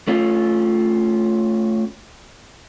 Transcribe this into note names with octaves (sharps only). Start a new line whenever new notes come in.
A3 C#4 F4